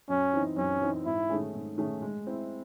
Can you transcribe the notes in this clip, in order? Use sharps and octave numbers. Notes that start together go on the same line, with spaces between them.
F#2 C#4
E3 C4 D#4
F#2 C#4
E3 C4 D#4
G#2 E4
D#3 A3 C#4 G#4
G#2
D#3 A3 C#4 G#4
G#3
C4 E4